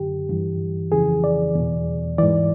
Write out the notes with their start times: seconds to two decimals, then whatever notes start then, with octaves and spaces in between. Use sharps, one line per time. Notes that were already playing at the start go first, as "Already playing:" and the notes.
Already playing: F#2 D3 G4
0.29 G2 E3
0.92 F2 C#3 E3 G#4
1.24 D5
1.55 E2 B2
2.18 G#2 E3 D5